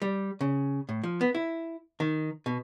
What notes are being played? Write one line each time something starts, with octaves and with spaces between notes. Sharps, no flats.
G3
C#3
A2
F3
B3
E4
D#3
B2